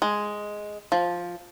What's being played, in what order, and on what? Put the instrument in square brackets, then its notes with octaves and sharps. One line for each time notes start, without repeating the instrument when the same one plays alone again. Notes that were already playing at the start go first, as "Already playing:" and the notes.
[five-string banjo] G#3
F3